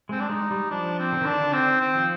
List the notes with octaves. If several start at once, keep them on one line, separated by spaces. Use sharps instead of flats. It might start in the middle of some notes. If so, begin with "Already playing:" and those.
G#3 C4
D4
G#3 D#4
G3
F3 D4
C4
D3
D#3 D4
D3
D#3 C4
C4
F3